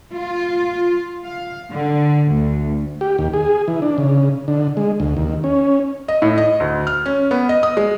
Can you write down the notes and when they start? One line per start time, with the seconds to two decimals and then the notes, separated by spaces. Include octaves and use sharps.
0.13 F4
1.26 F5
1.72 D3
2.28 D2
3.01 G4
3.19 D#2
3.34 G#4
3.68 E3
3.82 D4
3.98 C#3
4.48 D3
4.77 G#3
5.00 D2
5.17 D#2
5.44 C#4
6.08 D#5
6.22 A2
6.38 D#5
6.60 D2
6.87 F6
7.06 C#4
7.31 B3
7.49 D#5
7.63 D#6
7.77 G#3